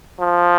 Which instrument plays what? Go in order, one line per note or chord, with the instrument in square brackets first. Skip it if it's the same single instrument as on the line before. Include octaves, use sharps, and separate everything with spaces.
[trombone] F3